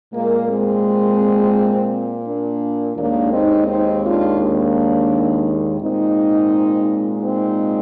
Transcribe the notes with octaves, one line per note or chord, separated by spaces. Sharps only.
A#2 G#3 A#3
G#3 C4
A#3 D4
D#2 D#3 G#3 A#3 D4
C4 D#4
C4 D#4
D4 F4
A#3 D4
A#2 G#3 C4 D#4
C4 D#4